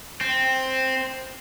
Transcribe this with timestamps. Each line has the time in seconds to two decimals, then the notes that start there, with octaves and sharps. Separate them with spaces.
0.21 C4